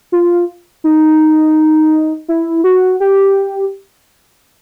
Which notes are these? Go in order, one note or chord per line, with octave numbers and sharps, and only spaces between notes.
F4
D#4
E4
F#4
G4